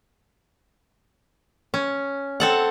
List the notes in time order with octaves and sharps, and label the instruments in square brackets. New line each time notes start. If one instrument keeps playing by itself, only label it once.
[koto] C#4
C4 A4 F#5